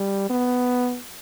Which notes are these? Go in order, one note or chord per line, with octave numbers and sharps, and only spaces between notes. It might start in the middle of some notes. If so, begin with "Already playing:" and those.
Already playing: G3
B3